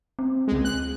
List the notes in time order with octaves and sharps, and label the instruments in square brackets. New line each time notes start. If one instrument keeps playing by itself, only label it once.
[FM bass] C4
[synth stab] C#2 G#3
F#6